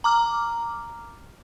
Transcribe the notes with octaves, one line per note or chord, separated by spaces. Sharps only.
A#5 D6 F6